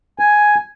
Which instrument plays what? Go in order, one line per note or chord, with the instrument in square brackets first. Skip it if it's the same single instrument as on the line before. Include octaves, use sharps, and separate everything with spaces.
[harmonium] G#5